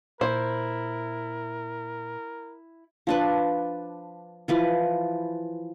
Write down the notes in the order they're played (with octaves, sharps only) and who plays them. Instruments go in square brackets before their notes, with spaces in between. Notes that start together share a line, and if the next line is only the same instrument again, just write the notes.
[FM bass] A#2 [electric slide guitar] E4 [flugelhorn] A#4 [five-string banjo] C5
[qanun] F3 D4 B4
E3 F3 B4